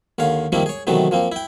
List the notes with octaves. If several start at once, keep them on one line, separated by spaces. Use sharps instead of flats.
D#2 D3 C#5 F5
D#3 F3 G3 A#3 C4 E4
G#4 C#5
C3 D#3 E3 F#3 A3 B3
F3 A#3 C4
E4 G5